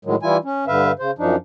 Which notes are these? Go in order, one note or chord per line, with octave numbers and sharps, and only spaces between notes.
A2 D#3 F#3 G#3
E3 G3 E4 F4 G#5
C#4
G2 D3 B4 E5 F5
C#3 C5
F#2 F3 D4 D#4